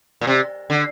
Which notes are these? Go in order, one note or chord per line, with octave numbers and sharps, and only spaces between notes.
A#2
C3
D3